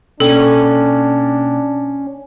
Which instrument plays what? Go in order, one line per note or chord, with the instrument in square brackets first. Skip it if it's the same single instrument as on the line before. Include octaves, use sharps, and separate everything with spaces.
[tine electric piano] B2 A#3 G5 [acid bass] C#4 [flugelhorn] D4 [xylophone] A4